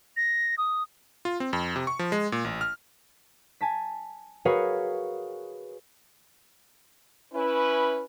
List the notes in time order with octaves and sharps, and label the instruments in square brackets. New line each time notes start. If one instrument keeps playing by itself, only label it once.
[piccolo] A#6
D#6
[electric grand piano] F4
C4
F2
C3
C#6
F3
G#3
A#2
A1
F6
[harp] G#5 A5 B6
F#4 G#4 A#4 B4 C#5 F5
[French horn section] C#4 E4 B4